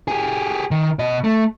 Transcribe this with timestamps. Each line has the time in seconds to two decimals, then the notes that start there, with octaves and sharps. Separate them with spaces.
0.08 G4 G#4
0.71 D#3
0.99 B2 D#5
1.24 A3